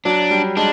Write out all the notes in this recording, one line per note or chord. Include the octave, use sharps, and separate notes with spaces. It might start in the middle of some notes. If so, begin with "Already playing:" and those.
F#3 D4
G3
G#3 D4